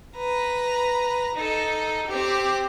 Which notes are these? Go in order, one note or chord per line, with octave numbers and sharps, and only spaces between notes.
B4 A#5
D#4 A4
C4 G4